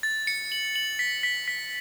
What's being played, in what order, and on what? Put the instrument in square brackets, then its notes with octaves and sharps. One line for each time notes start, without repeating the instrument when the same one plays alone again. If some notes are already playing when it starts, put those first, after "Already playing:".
[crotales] A6
C#7
F#7
F#7
B6
B6
B6